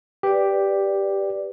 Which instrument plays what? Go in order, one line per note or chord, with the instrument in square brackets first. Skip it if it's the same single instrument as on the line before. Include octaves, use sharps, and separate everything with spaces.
[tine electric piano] G4 [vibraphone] B4 D5